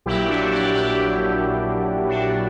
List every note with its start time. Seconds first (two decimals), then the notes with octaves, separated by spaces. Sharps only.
0.06 A#1 A#2 F#3 E4 G4
0.28 D4 F#4
0.51 E4 G4
0.73 E4 G4
2.08 D4 F#4